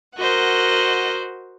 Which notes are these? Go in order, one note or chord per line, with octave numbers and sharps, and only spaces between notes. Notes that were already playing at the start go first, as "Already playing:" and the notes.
F#4 A#4 C5 D#5 F#5